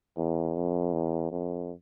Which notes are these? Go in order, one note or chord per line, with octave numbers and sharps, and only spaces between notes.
E2
F2
E2
F2